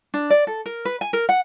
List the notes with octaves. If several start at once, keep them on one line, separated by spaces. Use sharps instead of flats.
D4
D5
A4
A#4
B4
G#5
A#4
F#5